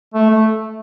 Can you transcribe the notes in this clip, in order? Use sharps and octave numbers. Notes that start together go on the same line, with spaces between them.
A3
A3